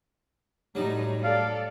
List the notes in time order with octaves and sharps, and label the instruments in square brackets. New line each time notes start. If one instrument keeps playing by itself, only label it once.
[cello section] A2 D#4 [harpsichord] F#3 G3
[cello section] A4 D5 [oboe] F5